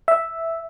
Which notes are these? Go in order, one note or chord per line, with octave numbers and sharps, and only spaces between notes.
E5